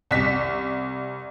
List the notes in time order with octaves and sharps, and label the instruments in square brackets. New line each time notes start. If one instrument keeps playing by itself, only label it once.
[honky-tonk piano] C2 B6